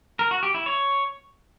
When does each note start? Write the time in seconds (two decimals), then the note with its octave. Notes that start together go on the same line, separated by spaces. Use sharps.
0.19 A#4
0.31 F#4
0.43 G4
0.54 E4
0.66 C#5